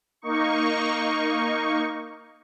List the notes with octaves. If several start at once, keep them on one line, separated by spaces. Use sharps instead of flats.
A#3 D#4 C#6